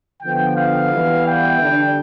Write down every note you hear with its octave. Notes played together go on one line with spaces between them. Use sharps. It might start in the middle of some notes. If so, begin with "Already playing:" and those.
D3 F3 B3 G5
F5
E3 G3 B3 E4
G5
D3 G3 D4